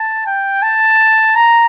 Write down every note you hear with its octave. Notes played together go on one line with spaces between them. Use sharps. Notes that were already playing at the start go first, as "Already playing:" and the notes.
Already playing: A5
G5
A5
A#5